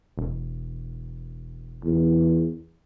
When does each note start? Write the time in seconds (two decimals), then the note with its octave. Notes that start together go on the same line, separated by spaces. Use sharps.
0.18 E1
1.85 E2